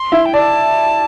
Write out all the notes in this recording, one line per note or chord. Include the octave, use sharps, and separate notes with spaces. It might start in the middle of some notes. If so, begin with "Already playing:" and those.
Already playing: C6
E4 E5
G5
D5 A5